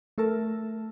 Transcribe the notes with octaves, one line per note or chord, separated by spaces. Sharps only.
A3 A4 A#4 A5